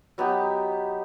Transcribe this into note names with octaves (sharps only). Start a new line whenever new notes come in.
F#3 B3 D#4 G4